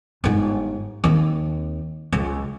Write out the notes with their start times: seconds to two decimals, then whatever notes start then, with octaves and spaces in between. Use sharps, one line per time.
0.24 G1 G#2
1.04 D#2 C4
2.12 C#2